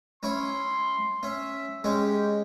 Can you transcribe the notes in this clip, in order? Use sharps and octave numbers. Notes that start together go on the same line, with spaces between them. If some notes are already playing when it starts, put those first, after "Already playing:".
C#4 E4 C#5 C6
C#4 E5
G#3 C#4 G4